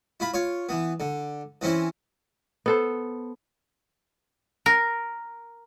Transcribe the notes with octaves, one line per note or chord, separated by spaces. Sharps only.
E4 F4 B5
F4 C#5
E3 B3
D3
E3 C4 C#4 E4 C5
B3 A4 C5
A#4